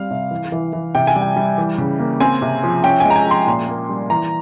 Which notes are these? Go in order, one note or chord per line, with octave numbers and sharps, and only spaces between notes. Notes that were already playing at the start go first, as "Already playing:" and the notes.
Already playing: G3 C4 F5
C3
E3
E3
E3
C3 G5
G#5
G3
G5
G3
E3
C#3
A#3
C4 G#5
C3
F3
C#4 G5
G#3 G#5
A#5
G#5
F3 C6
A#2
A#3
G3
E3 A#5